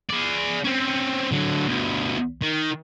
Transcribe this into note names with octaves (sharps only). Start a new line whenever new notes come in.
G#4 D5
C4 C#4
D3 F#3
D2 B2
D#3